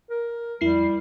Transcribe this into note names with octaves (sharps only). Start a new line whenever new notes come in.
A#4
F2 G3 E4 C7